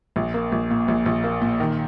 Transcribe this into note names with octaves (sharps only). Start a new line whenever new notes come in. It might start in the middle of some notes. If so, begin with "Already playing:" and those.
A#1
A#3
A#1
A#2
A#1
A#1
A#3
A#2
D#3